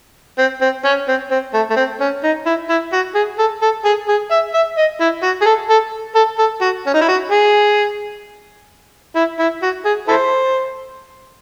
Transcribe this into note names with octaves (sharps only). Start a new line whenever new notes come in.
C4
C4
C#4
C4
C4
A3
A3
C4
C#4
D#4
E4
E4
F#4
G#4
A4
A4
G#4
G#4
E5
E5
D#5
E4
F#4
G#4
A4
A4
A4
A4
F#4
C#4
D#4
E4
F#4
G#4
E4
E4
F#4
G#4
E4 A4 C5